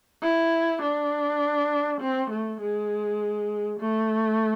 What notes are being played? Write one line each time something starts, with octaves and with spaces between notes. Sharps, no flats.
E4
D4
C4
A3
G#3
A3